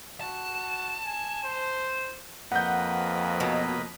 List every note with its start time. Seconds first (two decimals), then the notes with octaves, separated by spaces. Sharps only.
0.21 F#4 A5
1.06 G#5
1.44 C5
2.52 F2 A#3 B4 D#5 F#5 G6
3.40 B2 F#3